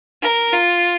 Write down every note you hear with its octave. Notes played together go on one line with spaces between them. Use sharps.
A#4
F4